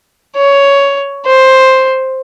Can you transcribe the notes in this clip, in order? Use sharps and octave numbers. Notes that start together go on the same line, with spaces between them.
C#5
C5